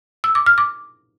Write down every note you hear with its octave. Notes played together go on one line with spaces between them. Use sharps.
E6
D6
F6
D6